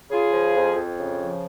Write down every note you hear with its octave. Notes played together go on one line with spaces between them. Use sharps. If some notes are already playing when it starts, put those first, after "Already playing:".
C#3 F4 G#4
F3
F2
F2
C#3
F3